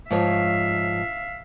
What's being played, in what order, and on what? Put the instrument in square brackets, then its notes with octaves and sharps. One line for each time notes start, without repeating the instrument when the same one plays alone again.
[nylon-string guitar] G#2 F3 C#5 [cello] E5 F5